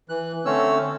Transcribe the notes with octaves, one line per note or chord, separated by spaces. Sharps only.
E3 F#6
D3 A3 C4 C#4 C#5 E6